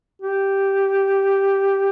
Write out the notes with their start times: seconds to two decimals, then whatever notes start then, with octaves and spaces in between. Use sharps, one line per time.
0.22 G4